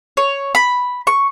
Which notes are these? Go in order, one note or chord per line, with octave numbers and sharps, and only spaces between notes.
C#5
B5
C#6